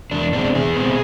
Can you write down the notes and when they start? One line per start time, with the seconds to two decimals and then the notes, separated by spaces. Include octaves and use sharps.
0.11 E2 D4
0.33 B2 G#3 C4 D4
0.55 E2 G#4
0.76 B2 G#3 C4